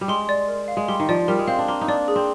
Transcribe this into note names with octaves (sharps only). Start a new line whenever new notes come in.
G3
G#3 C6
D5
A#4
F5
G#3
G3 C6
D#3
F3 D5
G3 A#4
G#3
C4 F5
D4
A#3 C6
D#4
D4 D5
G#4
C4